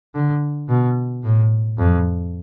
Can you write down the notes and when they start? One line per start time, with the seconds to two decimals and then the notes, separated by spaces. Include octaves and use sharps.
0.15 D3
0.69 B2
1.24 A2
1.78 F2